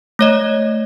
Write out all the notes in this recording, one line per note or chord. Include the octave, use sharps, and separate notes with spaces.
A3 C#5 D#5